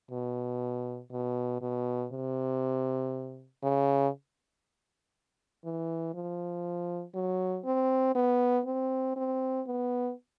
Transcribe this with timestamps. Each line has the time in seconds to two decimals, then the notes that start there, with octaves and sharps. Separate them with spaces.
0.11 B2
1.11 B2
1.61 B2
2.12 C3
3.63 C#3
5.64 E3
6.14 F3
7.14 F#3
7.65 C4
8.15 B3
8.66 C4
9.16 C4
9.67 B3